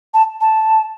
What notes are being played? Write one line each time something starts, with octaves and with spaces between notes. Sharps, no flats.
A5
A5